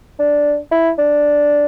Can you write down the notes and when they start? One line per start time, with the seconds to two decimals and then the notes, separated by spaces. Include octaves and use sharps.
0.19 D4
0.71 E4
0.98 D4